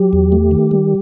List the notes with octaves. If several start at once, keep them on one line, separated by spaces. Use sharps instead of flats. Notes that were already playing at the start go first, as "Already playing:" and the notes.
Already playing: F#3 G4
E2
A3
D#3
G3